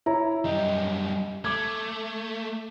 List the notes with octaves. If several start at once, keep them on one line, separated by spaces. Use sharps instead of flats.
E4 C#5 A#5
F#2 G3 D#5
A3 D6 G#6